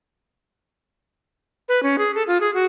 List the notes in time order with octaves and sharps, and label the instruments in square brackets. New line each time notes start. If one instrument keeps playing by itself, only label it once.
[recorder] B4
C#4
G#4
A4
F4
G#4
F#4